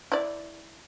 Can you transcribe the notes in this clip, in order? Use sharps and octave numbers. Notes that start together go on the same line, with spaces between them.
E4 D5